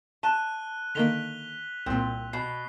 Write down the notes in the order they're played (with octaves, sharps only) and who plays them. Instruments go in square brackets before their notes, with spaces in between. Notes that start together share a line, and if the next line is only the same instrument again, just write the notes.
[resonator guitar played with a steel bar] A5 [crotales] F#6 D#7 G7
[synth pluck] D3 D#3 A#3 [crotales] B6 F7 G7
[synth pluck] C2 A#2 [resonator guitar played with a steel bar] C4
[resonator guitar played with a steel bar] B2 [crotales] C7